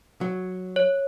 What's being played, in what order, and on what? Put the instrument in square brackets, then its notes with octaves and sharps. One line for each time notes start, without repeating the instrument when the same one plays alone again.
[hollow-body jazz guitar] F#3
[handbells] C#5